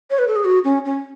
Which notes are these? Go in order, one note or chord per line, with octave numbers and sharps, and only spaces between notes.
C#5
B4
A4
G#4
F#4
C#4
C#4